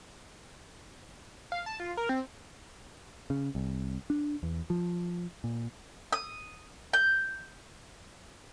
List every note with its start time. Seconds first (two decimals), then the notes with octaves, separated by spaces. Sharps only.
1.52 F5
1.66 A5
1.80 F4
1.97 A#4
2.09 C4
3.30 C#3
3.55 C2
4.10 D4
4.43 E2
4.70 F3
5.44 A#2
6.12 D#6
6.93 G6